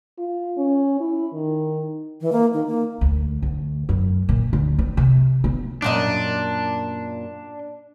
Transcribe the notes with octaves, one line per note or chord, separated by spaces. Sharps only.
F4
C#4
E4
D#3
E3
A#3
D#3
A#3
D2
D2
F#2
A#2
D2
C4
C3
B3
F#2 A#2 D4 D#5